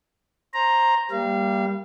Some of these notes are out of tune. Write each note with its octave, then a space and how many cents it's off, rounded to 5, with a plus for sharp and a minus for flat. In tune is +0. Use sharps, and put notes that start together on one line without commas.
C5 +15 A#5 +0
G3 +0 A#3 +15 F5 -35